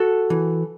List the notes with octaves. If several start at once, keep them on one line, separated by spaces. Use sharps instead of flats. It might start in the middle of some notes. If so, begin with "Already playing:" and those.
Already playing: F#4 A4
E3